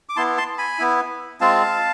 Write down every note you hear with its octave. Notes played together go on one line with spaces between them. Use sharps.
D6
B3 E4 A5 C6
A5 C6
G#5 B5
B3 E4
G#3 C4 F4 F5 A5